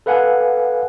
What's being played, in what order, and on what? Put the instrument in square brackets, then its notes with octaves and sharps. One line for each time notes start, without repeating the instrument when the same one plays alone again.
[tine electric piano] A4 B4 F5 F#5 G#5